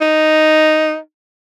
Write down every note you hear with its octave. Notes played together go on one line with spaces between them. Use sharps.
D#4